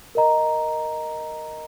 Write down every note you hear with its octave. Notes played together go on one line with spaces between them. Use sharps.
A#4 D#5 A#5